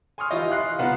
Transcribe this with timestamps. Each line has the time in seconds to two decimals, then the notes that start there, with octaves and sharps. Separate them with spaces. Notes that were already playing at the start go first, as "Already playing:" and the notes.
0.18 G#5 C6 C#6 D#6 F6
0.31 E3 E4 F4 G4 D#5
0.50 F5 C6 F#6 C7
0.79 C2 B3 F4 F#5